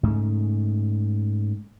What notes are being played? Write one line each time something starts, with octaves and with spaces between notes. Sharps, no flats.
G#2 C#3 A3